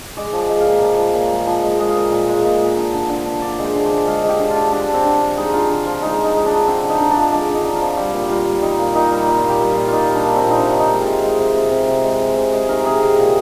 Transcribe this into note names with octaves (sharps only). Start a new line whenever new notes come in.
G#3 D5
F3
D5
G#3
F5
A#2
F3
F3
A#2
G#3
F3
G#3
G#3 D#5
F5
A#2 D#5
A#2
G#3
A#2
A#2
D3
D3
D3
D3
D3 D5
G#3 C5
D3
D5
D3
G#3 F5
G#3
G4
D3
F4
D3
D3 D4
D3
C4
D3
D3
G#3 D#4
D3 F4
D3
F3 F4
G#3 D#4
F3
D#4
G#3
D4
D3
D3 C4
D3
D#4
D3
D4
F3
G#3 D4
D3
D#4
D3
F4
F3
G3 G4
A#2
G3 F4
G3
G3 D#4
A#2
A#2 D#4
G3
A#2
F4
A#2
G4
G3
F4
A#2
A#2 D#4 F4
G3
D4
A#2
C4
A#2
D#4
C3 D4
D#3
D#4
G#3
F4
C3
G#3
C3
C3
C3
C3
G#3
C3
C3
G#3 G#4
D#3 A#4
C3 G#4
C3 G#4
A#2 A#4